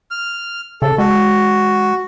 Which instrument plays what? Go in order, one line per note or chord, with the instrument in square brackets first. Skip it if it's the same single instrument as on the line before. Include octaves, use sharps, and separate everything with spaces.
[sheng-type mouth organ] F6
[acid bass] C#3 [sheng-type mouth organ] A4
[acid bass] G#3 [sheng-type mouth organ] F#4